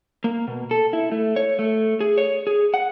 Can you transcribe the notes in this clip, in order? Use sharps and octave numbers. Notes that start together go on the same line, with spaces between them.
A#3
B2
A4
E4
A3
C#5
A3
G#4
C#5
G#4
F#5